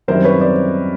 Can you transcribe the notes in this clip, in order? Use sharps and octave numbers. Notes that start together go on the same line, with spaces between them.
F#2 D#3 G3 C4 E4 A#4 C5
B4 C#5
C5 D5